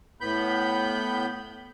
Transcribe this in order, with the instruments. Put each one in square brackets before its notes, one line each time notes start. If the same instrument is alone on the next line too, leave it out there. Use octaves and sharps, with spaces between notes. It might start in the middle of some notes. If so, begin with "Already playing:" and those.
[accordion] A2 B3 B5 G6